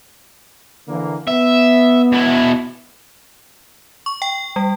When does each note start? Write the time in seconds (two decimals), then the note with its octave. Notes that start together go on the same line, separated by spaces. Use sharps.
0.88 D3 E3 A#3
1.27 B3 E5
2.13 B2 E4
4.06 C#6
4.22 G5
4.56 G3